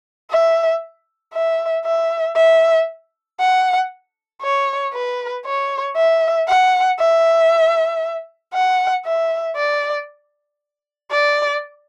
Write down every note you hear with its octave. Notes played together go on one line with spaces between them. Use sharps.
E5
E5
E5
E5
F#5
C#5
B4
C#5
E5
F#5
E5
F#5
E5
D5
D5